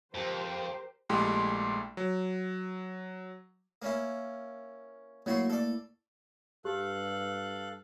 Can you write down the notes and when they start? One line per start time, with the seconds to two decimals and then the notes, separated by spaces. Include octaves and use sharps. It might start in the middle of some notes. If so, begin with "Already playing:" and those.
0.14 F2 G4 A#4 C5
1.09 A#1 G#3 A3 E4 G4 C6
1.97 F#3
3.82 A#3 C#4 E4
5.26 F#3 A3 A#3 E4 F#4 C6
5.50 A4 D5
6.65 G2 G4 A4 F5 F#6